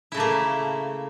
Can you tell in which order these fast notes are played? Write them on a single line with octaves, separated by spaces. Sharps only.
E4 C#3 A3 A#3